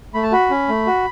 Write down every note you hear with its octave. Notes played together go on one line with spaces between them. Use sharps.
A3 B5
A5
F#4 B5
C#4
A3
F#4